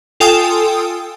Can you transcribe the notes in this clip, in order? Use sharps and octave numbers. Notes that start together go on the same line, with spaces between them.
F4 A4 G5 G#5 D#6